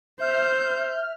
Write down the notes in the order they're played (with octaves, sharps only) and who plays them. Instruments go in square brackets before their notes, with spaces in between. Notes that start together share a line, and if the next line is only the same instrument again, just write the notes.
[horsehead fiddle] C5 [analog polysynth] E5 F6 [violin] G6